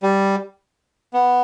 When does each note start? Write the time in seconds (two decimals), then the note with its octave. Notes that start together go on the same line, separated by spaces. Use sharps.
0.03 G3
1.14 B3